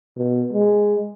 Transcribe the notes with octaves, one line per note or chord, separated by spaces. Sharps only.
B2
G#3